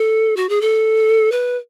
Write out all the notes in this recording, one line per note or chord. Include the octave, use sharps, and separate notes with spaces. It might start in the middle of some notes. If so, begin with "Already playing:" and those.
Already playing: A4
F#4
G#4
A4
B4